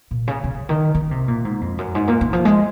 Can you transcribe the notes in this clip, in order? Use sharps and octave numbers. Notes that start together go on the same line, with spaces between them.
A#2
C#3
C#3
D#3
D#3
C3
A#2
G#2
F2
F#2
G#2
A#2
D#3
F3
G#3